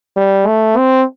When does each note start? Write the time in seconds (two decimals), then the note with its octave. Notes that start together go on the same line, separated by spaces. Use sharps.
0.16 G3
0.47 A3
0.77 C4